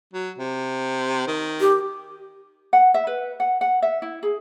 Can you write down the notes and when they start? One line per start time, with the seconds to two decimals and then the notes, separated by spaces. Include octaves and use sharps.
0.13 F#3
0.38 C3
1.27 D#3
1.61 G4
2.73 F#5
2.94 E5
3.07 B4
3.40 F#5
3.61 F#5
3.82 E5
4.02 E4
4.23 G#4